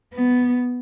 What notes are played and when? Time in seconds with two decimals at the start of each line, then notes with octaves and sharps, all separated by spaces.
0.14 B3